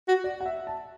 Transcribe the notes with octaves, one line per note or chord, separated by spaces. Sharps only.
F#4
D5
F#5
E5
A5